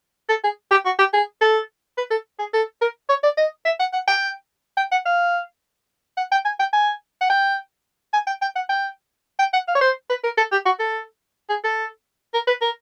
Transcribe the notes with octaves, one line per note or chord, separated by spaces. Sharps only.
A4
G#4
G4
F#4
G4
G#4
A4
B4
A4
G#4
A4
A#4
C#5
D5
D#5
E5
F#5
F#5
G5
G5
F#5
F5
F#5
G5
G#5
G5
G#5
F#5
G5
G#5
G5
G5
F#5
G5
G5
F#5
F5
C#5
C5
B4
A#4
A4
G4
F#4
A4
G#4
A4
A#4
B4
A#4